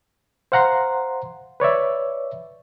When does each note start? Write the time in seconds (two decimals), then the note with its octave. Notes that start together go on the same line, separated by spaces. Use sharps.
0.52 C5 F5 F#5 A#5 C6
1.60 B4 C#5 D5 E5